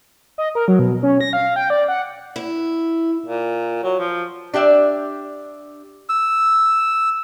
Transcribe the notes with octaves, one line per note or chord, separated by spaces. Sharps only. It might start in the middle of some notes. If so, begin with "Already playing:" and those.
D#5
A#4
F#3
B2
C#4
A#6
F5
G5
D5
F#5
E4
A#2
F#3
F3
D4 G4 D5 E5
E6